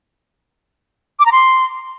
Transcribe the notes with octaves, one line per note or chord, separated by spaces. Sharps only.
D6
A#5
C6